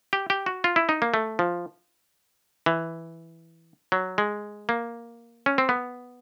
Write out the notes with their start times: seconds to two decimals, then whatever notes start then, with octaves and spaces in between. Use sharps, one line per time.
0.13 G4
0.30 G4
0.46 F#4
0.64 F4
0.76 E4
0.89 D#4
1.02 A#3
1.14 A3
1.39 F3
2.66 E3
3.92 F#3
4.18 G#3
4.69 A#3
5.46 C#4
5.58 C4
5.69 B3